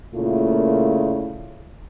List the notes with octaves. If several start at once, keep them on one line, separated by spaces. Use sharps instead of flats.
A#2 C#3 A3 A#3 E4 F4